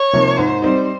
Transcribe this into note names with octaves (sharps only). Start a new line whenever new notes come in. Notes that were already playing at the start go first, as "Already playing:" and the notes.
Already playing: C#5
C3 F3 A#3 D#4
G#2 C5
G3 C4 D#4